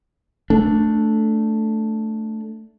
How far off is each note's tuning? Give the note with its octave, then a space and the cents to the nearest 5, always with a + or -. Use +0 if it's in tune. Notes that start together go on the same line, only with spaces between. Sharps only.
A3 +0 D4 +0